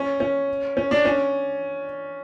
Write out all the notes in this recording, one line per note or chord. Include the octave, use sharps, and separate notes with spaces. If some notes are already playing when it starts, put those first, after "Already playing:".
Already playing: C#4
C#4
C#4
D4
C#4